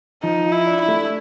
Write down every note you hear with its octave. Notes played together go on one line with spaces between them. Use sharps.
F3 D#4
F4
E4
D4
E4
A3